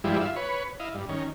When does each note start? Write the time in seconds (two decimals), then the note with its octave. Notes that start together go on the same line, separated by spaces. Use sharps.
0.04 G2 E3 F3 G3 G#3 E4
0.20 F4 E5
0.36 B4 C#5
0.80 E4 D#5 F5
0.94 G2
1.09 D#3 C#4